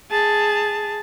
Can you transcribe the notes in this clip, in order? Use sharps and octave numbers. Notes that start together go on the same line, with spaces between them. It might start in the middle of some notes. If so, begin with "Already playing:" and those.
G#4 A5